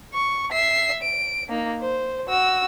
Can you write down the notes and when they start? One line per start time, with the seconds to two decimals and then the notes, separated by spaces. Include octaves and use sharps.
0.14 C#6
0.52 E5 C7
1.03 D7
1.49 A#3 D#4
1.81 C5
2.29 F#4 E6